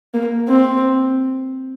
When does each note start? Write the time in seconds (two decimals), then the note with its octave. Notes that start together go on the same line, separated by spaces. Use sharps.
0.14 A#3
0.48 C4